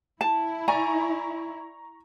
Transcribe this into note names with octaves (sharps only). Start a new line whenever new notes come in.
E4 A5
D5 G#5 A#5 C#6